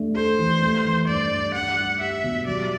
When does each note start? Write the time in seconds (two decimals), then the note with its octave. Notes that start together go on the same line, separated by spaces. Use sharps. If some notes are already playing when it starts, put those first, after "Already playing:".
Already playing: A3 D4
0.15 A4 C5
0.39 E3
0.62 A3
0.85 E3
1.08 G2 D5
1.32 G2
1.55 D4 F#5
1.78 G3
2.01 G4 E5
2.24 B2
2.47 F#3 D5